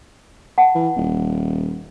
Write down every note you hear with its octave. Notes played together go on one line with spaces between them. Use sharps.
F#5 A5
E3
D#1